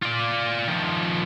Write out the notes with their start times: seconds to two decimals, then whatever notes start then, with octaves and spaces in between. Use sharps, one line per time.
0.02 F4 D5
0.68 D#3 F3